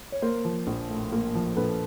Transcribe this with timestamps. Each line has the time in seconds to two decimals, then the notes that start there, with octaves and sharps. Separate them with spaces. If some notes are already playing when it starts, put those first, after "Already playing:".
0.12 C#5
0.22 A#3 A#4 C5
0.45 F3
0.67 A#1
0.89 A2
1.12 A#3
1.35 F3
1.57 A#1 A4 B4